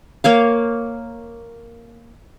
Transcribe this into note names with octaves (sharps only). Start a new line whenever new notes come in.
A#3 C#5 F5